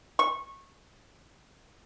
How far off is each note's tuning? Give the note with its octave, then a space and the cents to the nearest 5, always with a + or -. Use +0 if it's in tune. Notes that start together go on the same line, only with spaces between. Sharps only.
C#6 -20